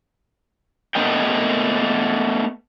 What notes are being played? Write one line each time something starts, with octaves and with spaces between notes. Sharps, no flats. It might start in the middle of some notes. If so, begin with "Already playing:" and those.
A3 B3 A#4 D#5 G5